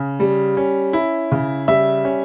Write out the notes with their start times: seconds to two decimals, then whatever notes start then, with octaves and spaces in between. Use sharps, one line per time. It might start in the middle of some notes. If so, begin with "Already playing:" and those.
Already playing: C#3
0.20 G3
0.57 C#4
0.93 E4
1.32 C#3
1.68 G3 E5
2.05 C#4